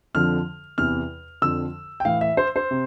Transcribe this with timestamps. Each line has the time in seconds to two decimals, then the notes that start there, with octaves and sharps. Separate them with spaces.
0.14 F2 D3 F3 F6
0.78 E2 C3 E3 F6
1.42 F2 D3 F3 E6
2.00 G5
2.05 A2 E3 F5
2.21 E5
2.37 C5
2.56 C5
2.71 C3